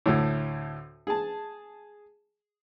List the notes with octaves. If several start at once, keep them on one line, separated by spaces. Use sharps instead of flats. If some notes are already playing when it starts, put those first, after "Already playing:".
D2 A2
G#4 A5